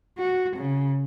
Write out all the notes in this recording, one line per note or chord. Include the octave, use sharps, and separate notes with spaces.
F#4
C#3